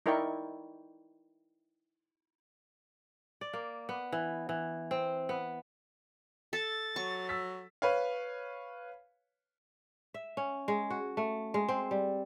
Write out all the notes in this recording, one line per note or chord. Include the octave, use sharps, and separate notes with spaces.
D#4 E4 A#4 D5 G5 C#6
D5
A#3
B3
E3
E3
C4
B3
A4 A6
F#3 C#6
E6 A6 B6
B4 C#5 F5
E5
C#4
G#3
F#4
A3
G#3
C4
G3